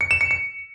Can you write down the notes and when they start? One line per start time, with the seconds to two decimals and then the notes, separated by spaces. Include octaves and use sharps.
0.01 C#7
0.11 E7
0.21 C#7
0.31 C#7